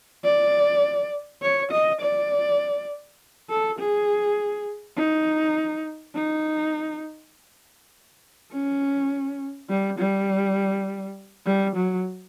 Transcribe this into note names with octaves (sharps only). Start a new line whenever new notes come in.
D5
C#5
D#5
D5
A4
G#4
D#4
D#4
C#4
G3
G3
G3
F#3